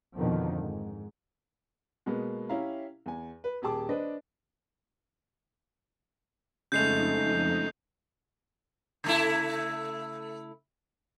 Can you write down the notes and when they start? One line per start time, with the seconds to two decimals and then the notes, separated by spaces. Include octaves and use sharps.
0.17 F2 B2 D3 D#3 F3
0.56 G#2
2.06 B2 G#3 A#3 B3
2.49 C#4 E4 G4 E5 F5 A#5
3.06 E2 G#5
3.44 B4
3.62 D#1 G4 G#4 A5 D6
3.89 D4 B4 C5 D#5
6.72 F2 C#3 G#3 A3 D#4 G6 C7 F7
9.04 C#3 A3 E4